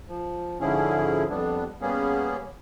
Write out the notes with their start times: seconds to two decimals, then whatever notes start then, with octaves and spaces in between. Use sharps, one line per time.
0.08 F3
0.60 G#2 D3 F3 C#4 E4 G#4
1.29 F2 G3 B3 D4
1.81 G3 A#3 B3 C#4 G#4